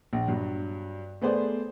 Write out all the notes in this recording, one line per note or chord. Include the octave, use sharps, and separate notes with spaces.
A#1
G2 F#3
A3 B3 G#4 C5 D5